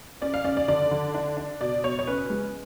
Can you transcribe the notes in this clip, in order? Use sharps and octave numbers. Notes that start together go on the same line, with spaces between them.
C#4 D5
F5
C#4 D5
D5
D3 D5
D3
D4
D4
B2 D5
B2 C#5
C#5
C#4 B4
G#3